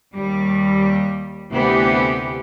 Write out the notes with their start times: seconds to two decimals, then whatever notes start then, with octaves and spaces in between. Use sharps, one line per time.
0.16 D#2 G3
1.53 D2 C3 E3 B3 G4